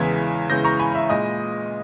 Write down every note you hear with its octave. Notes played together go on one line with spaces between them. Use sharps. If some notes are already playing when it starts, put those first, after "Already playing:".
Already playing: E2 C#3 E3 G#3 G#6 B6
E2 C#3 E3 G#3 G6 A#6
A#5 C#6
G#5 B5
E5
A#2 G#3 D#5